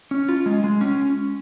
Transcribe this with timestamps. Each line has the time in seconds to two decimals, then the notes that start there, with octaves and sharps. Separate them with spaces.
0.11 C#4
0.29 F4
0.46 G#3
0.64 G#3
0.81 C#4